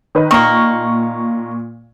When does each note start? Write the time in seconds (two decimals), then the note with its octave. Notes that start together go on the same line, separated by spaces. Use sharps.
0.15 D#3 B4 D#5
0.31 A#2 D#3 A#3 C#6